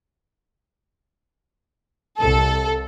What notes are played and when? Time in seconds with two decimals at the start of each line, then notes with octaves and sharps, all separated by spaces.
2.18 C2 A4